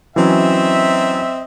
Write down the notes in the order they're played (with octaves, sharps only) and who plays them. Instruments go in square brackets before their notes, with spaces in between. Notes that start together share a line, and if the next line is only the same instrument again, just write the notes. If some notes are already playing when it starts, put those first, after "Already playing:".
[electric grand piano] E3 F#3 C#4 [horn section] C4 D#5 E5